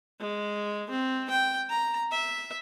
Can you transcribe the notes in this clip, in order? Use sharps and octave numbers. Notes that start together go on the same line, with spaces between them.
G#3
C4
G5
A#5
E5